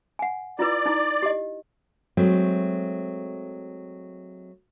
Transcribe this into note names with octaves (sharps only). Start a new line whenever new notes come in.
F#5 G#5
E4 F4 B4 D5
D#4 E4
G4 D#5
F#3 G#3 A3 C4